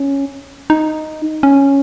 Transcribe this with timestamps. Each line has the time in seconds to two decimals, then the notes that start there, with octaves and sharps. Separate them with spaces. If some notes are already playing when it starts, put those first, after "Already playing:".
Already playing: C#4
0.70 D#4
1.43 C#4